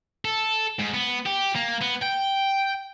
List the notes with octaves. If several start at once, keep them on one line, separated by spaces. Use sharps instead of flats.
A4
G#2
B3
G4
A#3
B3
G5